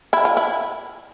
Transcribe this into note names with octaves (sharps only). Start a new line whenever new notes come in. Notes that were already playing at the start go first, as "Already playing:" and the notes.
E4
F4
E4